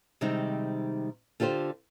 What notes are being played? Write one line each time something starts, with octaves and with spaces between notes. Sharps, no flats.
C3 D#3 G3 G#3 C4 D#4
D3 F4 G4 B4 C5